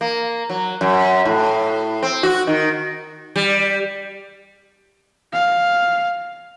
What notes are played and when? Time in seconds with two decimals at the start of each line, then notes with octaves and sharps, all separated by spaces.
0.01 A#3
0.50 F#3
0.81 F#2
1.25 A2
2.03 C4
2.23 F#4
2.47 D#3
3.36 G3
5.33 F5